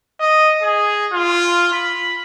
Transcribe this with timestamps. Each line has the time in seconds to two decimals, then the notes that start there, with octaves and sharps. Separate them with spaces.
0.20 D#5
0.62 G#4
1.12 F4
1.73 B5